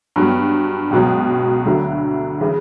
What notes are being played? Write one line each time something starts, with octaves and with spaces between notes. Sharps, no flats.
G2 F#3 B3
C#2 B2 F#3
D2 D3 F#3
C#3 E3